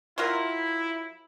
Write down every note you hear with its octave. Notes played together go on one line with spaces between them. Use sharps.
F#3 E4 F4 A#4